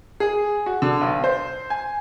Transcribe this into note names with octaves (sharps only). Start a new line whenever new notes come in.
G#4
F#4
D3
B1
C5
G#5